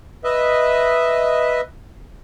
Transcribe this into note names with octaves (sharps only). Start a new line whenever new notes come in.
B4 D#5 E5